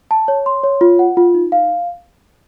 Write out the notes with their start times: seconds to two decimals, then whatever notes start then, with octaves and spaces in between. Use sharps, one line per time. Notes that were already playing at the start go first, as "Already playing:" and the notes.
0.11 A5
0.28 C#5
0.46 C6
0.64 C#5
0.81 F4
0.99 F#5
1.17 F4
1.34 D#4
1.52 F5